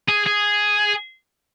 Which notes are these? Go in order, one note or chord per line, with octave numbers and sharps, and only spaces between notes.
G#4
G#4